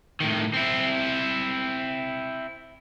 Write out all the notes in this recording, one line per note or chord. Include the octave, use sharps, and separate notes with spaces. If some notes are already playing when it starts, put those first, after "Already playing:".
A2 D#3
C4 E4